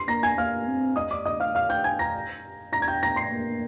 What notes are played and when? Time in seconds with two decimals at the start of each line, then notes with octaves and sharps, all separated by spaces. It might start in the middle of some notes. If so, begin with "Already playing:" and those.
Already playing: C6 C7
0.08 A#3 A#5 A#6
0.23 G#5 G#6
0.38 A#3 F5 F6
0.67 C4
0.96 D#5 D#6
1.11 D5 D6
1.25 D#5 D#6
1.40 F5 F6
1.55 F5 F6
1.69 G5 G6
1.84 G#5 G#6
1.99 A#5 A#6
2.72 A#5 A#6
2.82 G#6
2.88 G5 G6
3.03 A#5 A#6
3.16 C6 C7
3.32 A#3